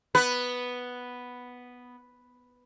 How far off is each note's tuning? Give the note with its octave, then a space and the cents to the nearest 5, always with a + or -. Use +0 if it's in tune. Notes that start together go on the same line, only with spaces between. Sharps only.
B3 +0 B4 +0